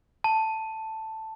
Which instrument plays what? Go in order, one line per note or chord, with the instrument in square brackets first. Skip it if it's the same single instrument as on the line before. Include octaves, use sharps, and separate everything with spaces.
[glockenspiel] A5